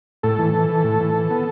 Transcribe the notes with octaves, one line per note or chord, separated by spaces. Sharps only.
A2 A4
E3
E3
E3
A2
E3
E3
B3